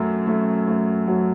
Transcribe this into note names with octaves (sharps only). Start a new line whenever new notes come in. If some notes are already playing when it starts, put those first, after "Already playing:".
Already playing: F#2 F#3 A3
A3
A3
F#3